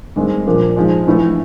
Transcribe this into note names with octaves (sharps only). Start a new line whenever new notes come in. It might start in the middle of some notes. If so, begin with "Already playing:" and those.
G2 D#3 G#3 C4
A#2 F3 A#3 D4
G#1 G#2 F3 G#3
A#1 A2 E3 A3